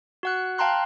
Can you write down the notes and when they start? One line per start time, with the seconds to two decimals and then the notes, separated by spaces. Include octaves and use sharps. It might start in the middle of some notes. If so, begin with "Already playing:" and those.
0.23 F#4 F#5 F#6
0.58 F5 G5 A5 A#5 C6 F#6